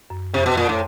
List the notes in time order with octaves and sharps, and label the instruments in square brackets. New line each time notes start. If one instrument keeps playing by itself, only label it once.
[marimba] F#2
[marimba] F2 [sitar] C3
[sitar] B2
A#2
A2